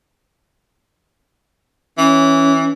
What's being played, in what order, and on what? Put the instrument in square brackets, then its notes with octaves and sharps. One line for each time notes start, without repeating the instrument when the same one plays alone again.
[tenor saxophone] E3 [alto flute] C#4